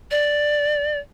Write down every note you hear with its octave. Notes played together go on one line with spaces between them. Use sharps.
D5